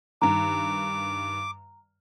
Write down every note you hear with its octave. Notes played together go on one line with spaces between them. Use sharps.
G2 D#3 A#5 D6